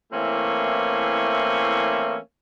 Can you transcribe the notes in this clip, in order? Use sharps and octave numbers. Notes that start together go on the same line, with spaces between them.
E3 A3 A#3 C4 C#4 E4